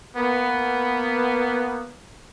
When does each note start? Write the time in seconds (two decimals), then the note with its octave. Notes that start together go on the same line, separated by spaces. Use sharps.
0.16 A#3 B3